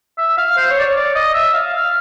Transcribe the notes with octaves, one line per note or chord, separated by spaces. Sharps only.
E5
F5
C5
C#5
D5
C#5
D5
D#5
E5
F5
F5